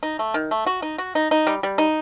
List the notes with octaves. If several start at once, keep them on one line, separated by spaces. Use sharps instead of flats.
D#4
A3
D#3
A3
F#4
D#4
F#4
D#4
D#4
G3
G3
D#4